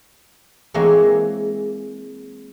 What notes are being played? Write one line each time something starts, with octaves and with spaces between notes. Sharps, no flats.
E3 G#3 A#3 C4 G#4 C#5